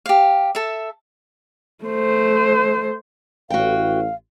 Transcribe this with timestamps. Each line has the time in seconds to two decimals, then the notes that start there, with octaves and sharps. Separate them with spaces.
0.06 G4 F5
0.55 A4 E5
1.84 A3 C5
3.50 A1 F#4 F5 G5